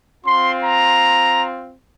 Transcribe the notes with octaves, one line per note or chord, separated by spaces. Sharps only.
C4 F4 C6
A#5